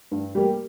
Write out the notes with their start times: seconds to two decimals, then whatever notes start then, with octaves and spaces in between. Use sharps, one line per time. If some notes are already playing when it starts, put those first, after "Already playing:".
0.11 G2
0.35 G3 A#3 G4